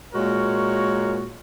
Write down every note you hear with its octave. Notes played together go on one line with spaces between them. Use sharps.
A#2 G#3 F#4 A#4 C#5